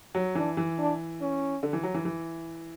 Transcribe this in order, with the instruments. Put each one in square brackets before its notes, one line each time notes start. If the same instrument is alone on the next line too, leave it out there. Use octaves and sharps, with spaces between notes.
[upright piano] F#3
[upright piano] E3 [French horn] D4
[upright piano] E3
[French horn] D4
C#4
[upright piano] D3
E3
F#3
E3
E3